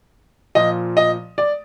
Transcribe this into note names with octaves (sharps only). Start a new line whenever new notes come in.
A#2 F3 D#5
D#5
D5